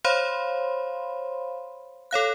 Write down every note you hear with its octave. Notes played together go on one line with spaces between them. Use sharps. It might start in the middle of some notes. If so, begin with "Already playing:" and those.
C5 C#5 F5 B5 C6
A4 C#5 F5 F#6